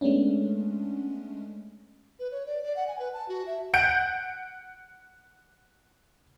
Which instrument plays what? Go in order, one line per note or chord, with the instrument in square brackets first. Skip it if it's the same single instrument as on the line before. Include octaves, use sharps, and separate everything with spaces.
[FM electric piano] G#3 A3 B3 C#4 D4
[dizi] B4
C#5
D5
D5
F#5
G#5
B4
A5
F#4
E5
[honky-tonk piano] F#5 G6 D7